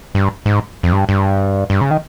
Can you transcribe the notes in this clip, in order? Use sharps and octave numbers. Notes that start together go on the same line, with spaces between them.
G2
G#2
F2
G2
G2
G2
C#3
D#3